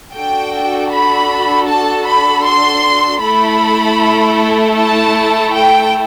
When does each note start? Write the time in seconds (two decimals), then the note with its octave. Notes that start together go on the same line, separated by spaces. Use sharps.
0.14 D4 F#4 A4 G5
0.91 B5
1.68 A5
2.07 B5
2.45 C6
3.22 A3 E4 A4 B5
4.76 A5
5.53 G5